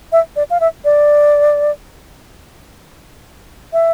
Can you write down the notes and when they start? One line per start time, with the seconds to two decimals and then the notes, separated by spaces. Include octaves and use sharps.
0.12 E5
0.36 D5
0.50 F5
0.60 E5
0.85 D5
3.73 E5